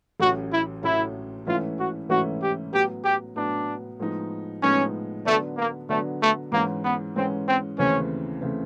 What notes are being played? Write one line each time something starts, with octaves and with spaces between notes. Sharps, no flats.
A1 A2 F#3 A3 C#4 F#4
E4
A1 A2 F#3 A3 C#4 E4
G#2 E3 A3 C#4 E4 F4
F#4
G#2 E3 A3 C#4 E4 F#4
G4
A2 F#3 B3 G4
G4
A2 F#3 B3 D4
A2 F3 G#3 B3 D#4
A2 F3 G#3 B3 C#4 D#4
D3 F#3 A3 B3 D4
A#3
D3 F#3 A3 B3 D4
A3
G#2 E3 G#3 A#3 C#4
B3
G#2 E3 G#3 C4 C#4
C4
D#2 C#3 E3 A3 C4 C#4
C#3 E3 A3 C4